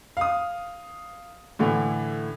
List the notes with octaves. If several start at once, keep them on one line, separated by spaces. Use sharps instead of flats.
F5 D#6
A2 D3 E3